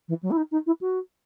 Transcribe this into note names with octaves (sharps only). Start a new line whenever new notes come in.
E3
F#3
E4
D#4
D#4
E4
F#4